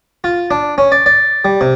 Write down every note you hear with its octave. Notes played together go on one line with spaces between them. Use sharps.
F4
D4
C#4
D5
D5
G3
C3